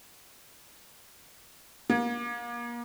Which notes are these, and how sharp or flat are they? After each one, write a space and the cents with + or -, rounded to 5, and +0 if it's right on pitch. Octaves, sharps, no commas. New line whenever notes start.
A#3 +35